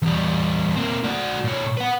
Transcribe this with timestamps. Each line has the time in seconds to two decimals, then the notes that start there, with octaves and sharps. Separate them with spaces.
0.02 E2 G3
0.75 A#3 C4
1.04 F#4 D5
1.44 A#2 C#5
1.77 B4 F#5